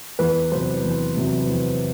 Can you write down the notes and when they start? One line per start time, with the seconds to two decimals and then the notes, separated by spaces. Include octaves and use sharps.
0.19 E2 B4
0.51 C3 F#3 C5
0.84 E2
1.17 C3 F#3
1.49 E2